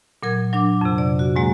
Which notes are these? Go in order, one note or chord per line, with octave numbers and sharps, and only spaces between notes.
A#2 F#3 A#4 G#6
F#3 D4 D6
F2 C3
D5
F#4
G#2 F#3 G#3 A#3